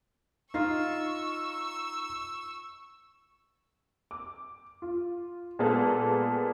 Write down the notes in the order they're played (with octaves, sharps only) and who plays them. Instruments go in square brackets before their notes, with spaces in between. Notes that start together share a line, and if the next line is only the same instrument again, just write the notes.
[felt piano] D#4 [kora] F4 F5 [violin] C#6 E6
[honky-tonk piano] D6
F4
A#2 G#3 A#3 B3 A4